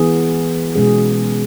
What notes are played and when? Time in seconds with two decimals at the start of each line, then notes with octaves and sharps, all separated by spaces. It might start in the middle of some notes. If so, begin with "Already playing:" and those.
Already playing: E3 B3 G#4
0.75 B2 G#3 C#4 G#4